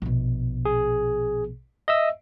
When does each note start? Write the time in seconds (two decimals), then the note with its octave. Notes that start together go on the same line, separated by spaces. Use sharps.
0.02 A#1 B2
0.65 G#4
1.88 D#5 E5 E6